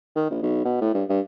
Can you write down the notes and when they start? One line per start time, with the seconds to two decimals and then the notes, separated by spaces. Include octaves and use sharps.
0.15 D#3
0.30 A#1
0.42 B1
0.65 B2
0.81 A2
0.94 G2
1.09 G2